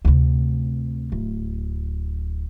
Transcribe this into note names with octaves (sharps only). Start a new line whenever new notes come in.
D2 C3
D1